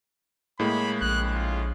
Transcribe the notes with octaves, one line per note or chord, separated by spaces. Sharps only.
A2 G#3 A#3 B5
A#1 F#6
F4